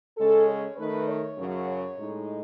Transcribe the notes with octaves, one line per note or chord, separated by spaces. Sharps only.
C#3 G#3 C#4 A4
C#5
D#3 A3 D#4 B4
C#5
F#2 C#3 F#3
C#5
A2 G#3 D#4